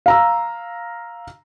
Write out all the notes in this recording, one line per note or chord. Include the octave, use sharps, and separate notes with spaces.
F5 A#5 E6